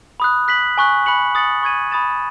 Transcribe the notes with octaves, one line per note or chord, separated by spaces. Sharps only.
B5 D#6 F#6
F#6 B6 F#7
G#5 C#6 F#6
B5 F#6 C#7 F#7
D#6 A6 C#7 F#7
C#6 G#6 D#7
B5 D#6 A6 E7